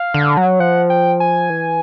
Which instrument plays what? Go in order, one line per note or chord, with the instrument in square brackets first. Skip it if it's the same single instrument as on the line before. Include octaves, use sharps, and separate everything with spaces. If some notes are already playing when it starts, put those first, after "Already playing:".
Already playing: [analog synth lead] F5
[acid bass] D3
F#3
[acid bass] F3 [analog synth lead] F#5
[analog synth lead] G5
G#5
[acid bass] E3